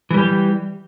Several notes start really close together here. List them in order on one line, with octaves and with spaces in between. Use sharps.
E3 G3 G4